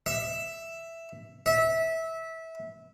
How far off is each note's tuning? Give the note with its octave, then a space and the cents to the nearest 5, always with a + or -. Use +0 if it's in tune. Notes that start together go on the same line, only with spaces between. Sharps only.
E5 +5
E5 -20